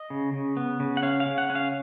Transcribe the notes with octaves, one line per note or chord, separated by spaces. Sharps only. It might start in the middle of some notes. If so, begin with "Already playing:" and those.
Already playing: D#5
C#3
C#3
B3
C#3
F#5
C#4 F5
F5
C#3
F#5
C#4
F5